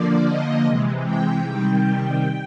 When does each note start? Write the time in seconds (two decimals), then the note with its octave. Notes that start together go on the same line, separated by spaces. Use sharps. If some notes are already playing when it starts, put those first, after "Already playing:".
Already playing: D3 F3 A#3 D5
0.26 D#5
0.65 C3 E3 G#3
1.04 G5
1.45 C3 D#3 G3